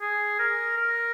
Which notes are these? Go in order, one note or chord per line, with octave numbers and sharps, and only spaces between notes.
G#4
A#4
A#4